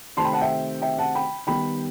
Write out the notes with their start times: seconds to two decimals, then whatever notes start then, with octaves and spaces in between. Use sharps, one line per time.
0.17 C3 D#3 A3 C4 A5 C6
0.25 G5 B5
0.33 F#5 A5
0.41 E5 G5
0.82 E5 G5
0.99 F#5 A5
1.15 G5 B5
1.47 D#3 G3 B3 D#4 G5 B5